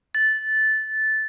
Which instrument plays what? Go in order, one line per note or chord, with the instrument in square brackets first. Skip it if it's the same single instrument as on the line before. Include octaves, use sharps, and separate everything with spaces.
[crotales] A6